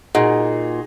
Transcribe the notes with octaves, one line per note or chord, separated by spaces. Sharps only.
A#2 D#4 F#4 G#4